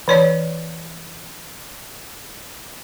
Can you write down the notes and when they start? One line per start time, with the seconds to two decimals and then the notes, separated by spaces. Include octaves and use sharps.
0.08 E3 C#5 D5